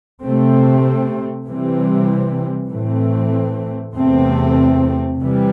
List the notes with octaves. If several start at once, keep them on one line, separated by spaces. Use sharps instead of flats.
C3 A3 C4
C3 E3 G3 C4
A2 E3 A3 C4
E2 C3 A3 C4
C3 E3 G3